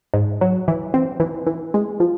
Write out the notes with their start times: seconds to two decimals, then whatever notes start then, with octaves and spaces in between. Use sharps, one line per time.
0.14 G#2
0.41 F#3
0.68 E3
0.94 C4
1.20 E3
1.47 E3
1.74 G#3
2.00 F3